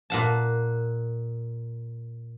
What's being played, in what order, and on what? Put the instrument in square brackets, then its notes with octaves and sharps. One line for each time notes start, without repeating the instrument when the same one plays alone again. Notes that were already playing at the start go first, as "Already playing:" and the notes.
[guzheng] A#2 F#5 A5